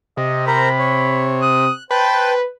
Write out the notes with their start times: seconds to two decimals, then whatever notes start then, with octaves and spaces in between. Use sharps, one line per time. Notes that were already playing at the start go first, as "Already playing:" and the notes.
0.17 C3 D#5
0.47 A#4 C5 A#5 B5
0.78 C#5
1.42 D#6 F#6
1.91 B4 C5 G5 A5